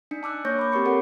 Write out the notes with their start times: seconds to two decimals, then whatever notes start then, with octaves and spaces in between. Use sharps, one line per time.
0.11 D4 D#4 C#7
0.23 A5 D6 E6 F#6
0.45 A#3 C#5 C#6 G6 A#6
0.59 B5 D6
0.72 C4 G4 A#4 C#6 C#7
0.85 G4 A4 A#4 C#5 F#5